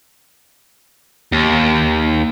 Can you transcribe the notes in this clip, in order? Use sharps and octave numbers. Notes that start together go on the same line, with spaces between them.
D#2